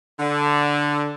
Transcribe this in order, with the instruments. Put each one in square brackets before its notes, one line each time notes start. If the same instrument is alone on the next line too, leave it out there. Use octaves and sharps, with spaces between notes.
[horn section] D3